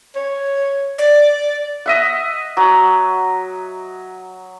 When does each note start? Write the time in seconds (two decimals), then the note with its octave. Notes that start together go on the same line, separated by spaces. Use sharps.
0.15 C#5
0.98 D5
1.86 D#5 E5 F#5
2.57 F#3